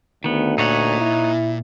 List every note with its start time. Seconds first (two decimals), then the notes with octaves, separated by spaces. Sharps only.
0.24 D2 D#3 B3
0.58 A#2 D#4 C#5 F#5
1.00 E4